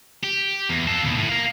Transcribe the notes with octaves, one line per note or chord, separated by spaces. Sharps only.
G4
E2
F4 A4
D#2 B2
A2
A#4 F5